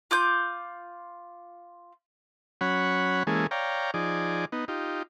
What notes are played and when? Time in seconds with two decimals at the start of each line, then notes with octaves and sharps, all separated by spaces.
0.11 F4 D6 G6
2.61 F#3 C#4 C#5 F#5 B5
3.27 E3 G#3 A#3 C#4 G#4 A4
3.51 C#5 D5 F5 G5 A#5
3.94 F3 D#4 G#4 D5
4.52 B3 D#4
4.68 D#4 F4 G4